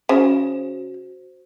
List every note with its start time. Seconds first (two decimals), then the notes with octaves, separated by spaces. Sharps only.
0.09 C#3 F#4 C5